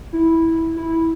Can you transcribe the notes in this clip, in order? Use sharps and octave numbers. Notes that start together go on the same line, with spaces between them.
E4
E4